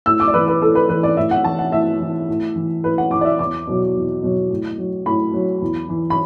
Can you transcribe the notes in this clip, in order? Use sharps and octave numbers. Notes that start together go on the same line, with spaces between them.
A2 E6
D6
D5
E3 B4
B4
A2 A4
B4
E3 B4
D5
A2 E5
F#5
E3 A5
F#5
A2 E5
E3
A2
E3
A2 B4
F#5
E3 D6
D5
E5
E2 D6
B2 F#3
E2
B2 F#3
A2
F#3
A2 B5
F#3
E2
E3
B5